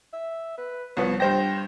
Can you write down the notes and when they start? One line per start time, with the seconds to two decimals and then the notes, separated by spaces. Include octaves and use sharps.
0.13 E5
0.57 B4
0.97 C2 F3 B3 C#5
1.20 G2 C5 G5 A#6